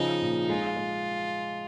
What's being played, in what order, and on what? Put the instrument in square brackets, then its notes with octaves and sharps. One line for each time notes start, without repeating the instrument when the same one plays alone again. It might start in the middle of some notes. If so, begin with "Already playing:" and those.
Already playing: [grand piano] C#3 F3 [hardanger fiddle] D#4
[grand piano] A#2
[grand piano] G#3 [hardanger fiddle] F4
[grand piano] G#3